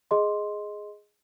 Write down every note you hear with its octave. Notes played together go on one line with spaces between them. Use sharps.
G#4 D#5 C6